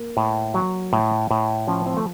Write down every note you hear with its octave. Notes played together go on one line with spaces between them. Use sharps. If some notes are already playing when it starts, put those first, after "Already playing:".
Already playing: A#3
A2
F#3
A2
A2
F3 C#4
C4
A3